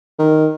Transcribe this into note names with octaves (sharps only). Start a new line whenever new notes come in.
D#3